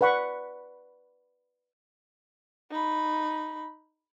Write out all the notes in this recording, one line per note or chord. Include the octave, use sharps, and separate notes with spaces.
B4 D5 F#5 B5 C#6
D#4 B5